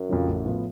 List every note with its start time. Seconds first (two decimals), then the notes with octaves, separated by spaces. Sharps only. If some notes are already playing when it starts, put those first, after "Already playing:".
Already playing: F#2
0.09 F2 C#3 F3
0.27 A1
0.45 A2 F3 B3 F4